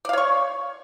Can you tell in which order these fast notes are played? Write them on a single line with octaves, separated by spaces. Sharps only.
D5 F5 C#5 C#6